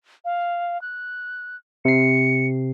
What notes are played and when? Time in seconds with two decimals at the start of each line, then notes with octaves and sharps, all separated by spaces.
0.25 F5
0.82 F#6
1.85 C3 C7 C#7